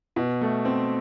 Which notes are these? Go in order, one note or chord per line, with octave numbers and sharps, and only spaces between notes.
B2
A3
C4